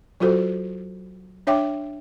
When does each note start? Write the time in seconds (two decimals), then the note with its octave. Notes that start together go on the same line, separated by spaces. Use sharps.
0.20 F#3 F4 F#4 A4 C5
1.47 D4 C#5 E5 G5 D6